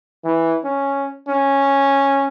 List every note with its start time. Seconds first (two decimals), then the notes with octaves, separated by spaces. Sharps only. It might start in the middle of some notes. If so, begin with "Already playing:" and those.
0.25 E3
0.64 C#4
1.28 C#4